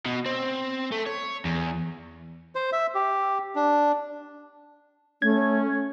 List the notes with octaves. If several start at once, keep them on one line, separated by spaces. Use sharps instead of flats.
B2
C4
A3
C#5
E2
C5
E5
G4
D4
A3 C#4 G#6